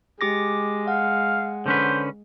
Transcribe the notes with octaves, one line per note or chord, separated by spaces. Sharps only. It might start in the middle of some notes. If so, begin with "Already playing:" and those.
G#3 G4 D6 A#6
F5 F#5
D3 C#4 B4 C5